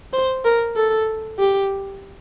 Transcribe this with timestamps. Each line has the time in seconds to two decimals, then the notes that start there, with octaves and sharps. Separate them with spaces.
0.13 C5
0.45 A#4
0.76 A4
1.40 G4